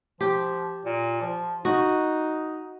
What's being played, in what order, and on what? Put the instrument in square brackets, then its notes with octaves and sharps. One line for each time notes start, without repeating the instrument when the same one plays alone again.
[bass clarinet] F3 [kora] G4
[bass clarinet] A#2
F3
[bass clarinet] D#4 [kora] F#4